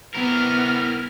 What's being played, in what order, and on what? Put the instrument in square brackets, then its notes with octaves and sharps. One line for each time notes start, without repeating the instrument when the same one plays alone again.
[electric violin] B3 F6 [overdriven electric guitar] E4 A#4